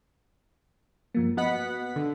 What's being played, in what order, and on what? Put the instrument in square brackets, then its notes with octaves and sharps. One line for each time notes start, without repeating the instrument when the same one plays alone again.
[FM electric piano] G2 F3 A#3
[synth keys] B3 F#5 B6 [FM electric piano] F#4 D#5
[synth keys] D3